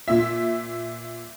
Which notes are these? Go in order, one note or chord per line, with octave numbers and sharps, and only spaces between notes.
A#2 E5